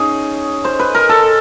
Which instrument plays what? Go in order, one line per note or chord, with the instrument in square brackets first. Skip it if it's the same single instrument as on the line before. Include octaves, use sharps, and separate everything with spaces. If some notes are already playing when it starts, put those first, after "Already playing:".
Already playing: [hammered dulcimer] C#4 D#4 G#4
C5
B4
A#4
A4